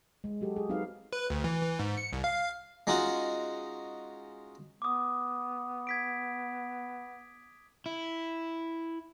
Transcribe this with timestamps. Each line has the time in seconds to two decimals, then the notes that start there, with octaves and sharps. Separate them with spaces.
0.24 G#3
0.41 F#3 F#4 G4 A4
0.56 G#4
0.69 F#3 C4 D#4 F#4 B4 F5
1.13 B4
1.30 D2
1.44 E3
1.63 E3
1.79 G#2
1.97 C#7
2.13 C2
2.24 F5
2.87 G#3 C#4 D#4 F4 F#4
4.82 B3 D6 D#6
5.87 G#6 B6 D7
7.86 E4